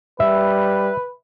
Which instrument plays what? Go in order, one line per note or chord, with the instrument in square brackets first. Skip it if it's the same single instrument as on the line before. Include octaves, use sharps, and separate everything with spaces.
[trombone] G3 [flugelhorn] B4 [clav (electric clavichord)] E5